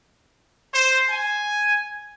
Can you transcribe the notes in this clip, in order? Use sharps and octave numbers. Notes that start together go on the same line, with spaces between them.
C5
G#5